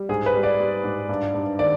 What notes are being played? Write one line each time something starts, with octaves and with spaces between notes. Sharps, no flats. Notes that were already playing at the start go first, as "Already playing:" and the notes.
Already playing: G3
G#2 G#4
B4
G3
D5
G3
G#2
G2
G2
D#3 D5